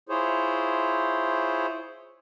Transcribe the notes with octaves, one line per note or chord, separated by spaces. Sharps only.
E4 F4 G#4 C5 C#5